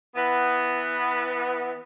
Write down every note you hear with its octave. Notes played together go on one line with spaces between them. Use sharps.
E3 B3